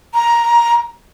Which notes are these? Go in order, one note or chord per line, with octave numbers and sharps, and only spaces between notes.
A#5